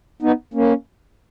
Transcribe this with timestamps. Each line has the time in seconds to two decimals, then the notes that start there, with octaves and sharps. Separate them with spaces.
0.22 B3 D#4
0.54 A#3 C#4